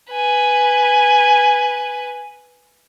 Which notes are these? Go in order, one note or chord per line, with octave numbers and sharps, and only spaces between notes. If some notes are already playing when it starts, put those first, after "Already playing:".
B4 G#5